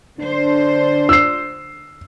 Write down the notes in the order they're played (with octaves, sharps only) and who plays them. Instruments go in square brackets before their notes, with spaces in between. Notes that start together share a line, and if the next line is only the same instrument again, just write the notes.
[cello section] D3 C5 [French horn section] D4
[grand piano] E6 C7